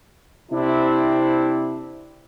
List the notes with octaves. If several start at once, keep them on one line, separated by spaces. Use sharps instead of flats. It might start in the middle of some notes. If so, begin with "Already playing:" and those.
C3 C4 D4 E4